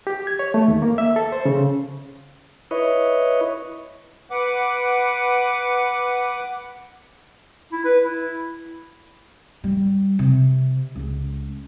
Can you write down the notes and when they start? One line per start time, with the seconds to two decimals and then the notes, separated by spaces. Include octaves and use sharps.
0.07 G4
0.27 G#6
0.39 C#5
0.54 A3
0.68 D#2
0.82 A#3
0.98 E5
1.16 A4
1.32 C5
1.45 C#3
2.71 E4 B4 C#5 D#5
4.31 B4 F#5 D6
7.72 E4
7.85 B4
8.04 E4
9.64 G3
10.19 C3
10.95 C#2